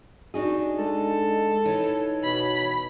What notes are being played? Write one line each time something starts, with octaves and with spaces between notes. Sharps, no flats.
D4 D#4 F#4 G#4
G#3 A4
E3 D#4 C#5
B2 B5